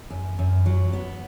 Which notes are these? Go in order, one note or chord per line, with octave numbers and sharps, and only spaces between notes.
F#2
F#2
F#3
B3